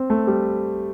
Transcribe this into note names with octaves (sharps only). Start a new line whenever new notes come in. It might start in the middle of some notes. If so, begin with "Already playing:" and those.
Already playing: C4
A3
G3